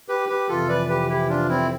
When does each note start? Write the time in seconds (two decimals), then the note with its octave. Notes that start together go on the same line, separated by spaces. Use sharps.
0.09 G4 B4
0.29 G4 B4
0.49 F2 C3 E3 F4 A4
0.69 B4 D5
0.89 G4 B4
1.09 E4 G4
1.29 D4 F4
1.49 C4 E4